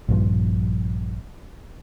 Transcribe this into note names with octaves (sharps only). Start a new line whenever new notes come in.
A#1 G2 F3